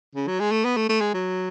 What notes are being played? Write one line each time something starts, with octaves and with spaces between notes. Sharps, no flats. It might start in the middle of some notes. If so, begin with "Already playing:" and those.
C#3
F#3
G#3
A3
B3
A3
A3
G#3
F#3